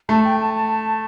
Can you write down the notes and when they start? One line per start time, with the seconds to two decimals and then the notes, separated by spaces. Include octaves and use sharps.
0.09 A3 A5
0.25 G5
0.40 A5
0.55 A5